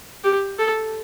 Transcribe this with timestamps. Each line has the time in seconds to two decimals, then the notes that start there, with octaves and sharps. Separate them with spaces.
0.24 G4
0.59 A4